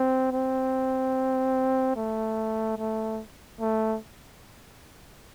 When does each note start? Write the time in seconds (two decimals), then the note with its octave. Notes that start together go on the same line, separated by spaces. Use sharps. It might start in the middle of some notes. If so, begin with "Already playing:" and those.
Already playing: C4
0.32 C4
1.96 A3
2.78 A3
3.60 A3